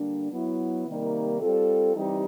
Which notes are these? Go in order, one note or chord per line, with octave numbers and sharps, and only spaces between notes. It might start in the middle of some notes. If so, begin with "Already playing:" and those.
Already playing: D3 G3 A#3 D4
F#3 B3 E4
C3 D#3 G3 A#3 D#4
G3 C4 F4 A4
E3 G3 C4 D#4 G4